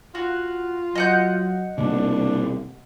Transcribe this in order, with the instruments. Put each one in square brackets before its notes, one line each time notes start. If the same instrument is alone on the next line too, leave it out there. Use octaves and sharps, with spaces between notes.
[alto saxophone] F4 [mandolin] F#4
[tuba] F#3 [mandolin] D#5 F#5 G6
[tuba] C2 [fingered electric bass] B2 D#3 A#3 [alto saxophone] D4